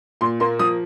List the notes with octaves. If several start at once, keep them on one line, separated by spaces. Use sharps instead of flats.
A#2 C6
A#3 C6
F3 D#6